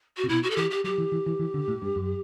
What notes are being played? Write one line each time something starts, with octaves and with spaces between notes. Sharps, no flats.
F#4
C3
B2 E4
F#4
A4
E3 G4
G4
F#3 G4
E3
E3
E3
E3
D3
A2
G2
F#2